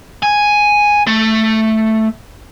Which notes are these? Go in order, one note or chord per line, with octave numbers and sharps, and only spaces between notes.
G#5
A3